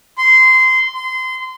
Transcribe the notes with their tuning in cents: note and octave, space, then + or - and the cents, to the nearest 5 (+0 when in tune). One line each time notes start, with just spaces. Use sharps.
C6 -15
C6 -25